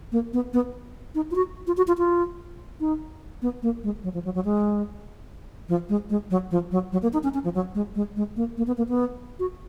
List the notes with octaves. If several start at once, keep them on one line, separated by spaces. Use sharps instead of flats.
A#3
B3
B3
D#4
F4
F#4
F4
F#4
F4
F4
D#4
B3
A#3
G#3
F#3
F3
F#3
F#3
G#3
F3
G#3
G#3
F#3
F3
F#3
F#3
A#3
D#4
C#4
C#4
F3
F#3
G#3
G#3
G#3
A#3
A#3
B3
A#3
B3
F#4